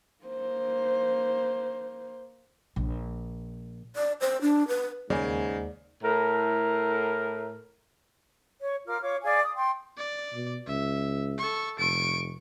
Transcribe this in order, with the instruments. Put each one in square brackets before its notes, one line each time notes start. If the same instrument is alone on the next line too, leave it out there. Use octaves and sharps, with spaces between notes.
[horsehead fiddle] A#3 C5
[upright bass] A#1
[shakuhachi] D5
C5
D4
B4
[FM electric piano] D#2 G#3 A#3 [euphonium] G#2 [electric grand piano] C#3 G#5 [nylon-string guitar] D5
[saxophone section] A2 A#4
[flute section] C#5
F4 A#4 D6 F6
F4 C#5 D6
G#4 D5 F5 G#5
D#6
G5 C6
[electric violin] D5
[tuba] B2
[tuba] C#2 [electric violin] E5
[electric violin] A4 C#6
[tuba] F1 [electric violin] C#6 D7